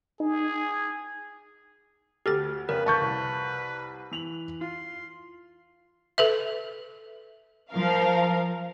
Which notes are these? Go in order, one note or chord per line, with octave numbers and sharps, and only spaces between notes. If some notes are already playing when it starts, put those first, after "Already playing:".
D#4 G#4
D2 G4 A4 F6 A6
F2 C#3 A#4 B4
B4 A5 C#6 G6
C2
E3 F7 F#7
F4 C6
A4 B4 E5
F3 A#4 F5